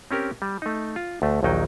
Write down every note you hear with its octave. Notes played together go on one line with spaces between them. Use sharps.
C4 C#4 G4 A#4
G3
A3 D#4
F4
D2 A3
A#1 D#2 D#3 F#3 D#4 G5